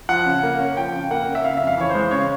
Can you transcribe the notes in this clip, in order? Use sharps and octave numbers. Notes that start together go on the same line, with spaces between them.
F3 F#5
C#3
A#3
C#4
F3 G5
C#3
A#3 F#5
C#4
E5
C#3 F5
F2 E5
F5
E3 C#5
C5
G#3
C#3 C#5